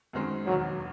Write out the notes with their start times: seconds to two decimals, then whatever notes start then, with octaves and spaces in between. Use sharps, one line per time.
0.13 F#2 D#3 G#3 C4
0.46 E1 D#2 D#3 F#3